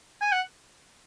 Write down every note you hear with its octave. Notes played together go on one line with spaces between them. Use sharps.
G#5
F#5